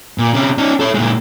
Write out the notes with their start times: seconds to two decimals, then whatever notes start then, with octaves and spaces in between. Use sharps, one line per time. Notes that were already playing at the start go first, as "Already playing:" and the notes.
0.18 A#2
0.34 C3 C#4
0.58 C#4 D#4
0.80 A4 C#5
0.95 A#2 G#3